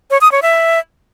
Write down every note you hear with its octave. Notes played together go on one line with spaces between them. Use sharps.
C#5
D#6
C#5
E5